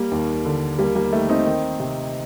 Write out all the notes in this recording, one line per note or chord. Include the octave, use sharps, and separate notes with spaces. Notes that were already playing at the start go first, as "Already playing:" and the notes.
Already playing: G3 A#3
D#2
D3
D#2 G3 A#3
G3 A#3
D#3 A3
C4 D#4
D#3
C3